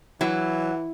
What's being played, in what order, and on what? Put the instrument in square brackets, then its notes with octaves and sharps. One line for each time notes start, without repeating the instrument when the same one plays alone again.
[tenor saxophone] E3 [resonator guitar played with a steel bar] F#3 [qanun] E4